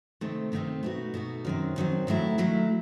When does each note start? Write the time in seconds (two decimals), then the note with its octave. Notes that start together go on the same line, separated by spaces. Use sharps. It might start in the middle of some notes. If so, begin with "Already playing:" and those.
0.21 C3 D#3 A3 C4 D#4
0.52 C3 D#3 A3 C4 D#4
0.83 B2 A3 D#4 F#4
1.14 B2 A3 D#4 F#4
1.45 F#2 D#3 F#3 C4
1.76 F#2 D#3 F#3 C4
2.07 D#3 F#3 A3 E4
2.38 D#3 F#3 A3 E4